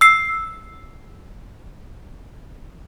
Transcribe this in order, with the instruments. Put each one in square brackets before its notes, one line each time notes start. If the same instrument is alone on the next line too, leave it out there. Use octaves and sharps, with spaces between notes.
[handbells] E6 C7